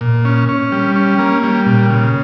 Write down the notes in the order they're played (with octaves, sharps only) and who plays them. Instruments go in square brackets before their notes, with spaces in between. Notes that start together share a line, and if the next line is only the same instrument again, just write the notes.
[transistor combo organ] A#2
C#4
C#4
G3
C#4
A#3
G3
A#2
C#3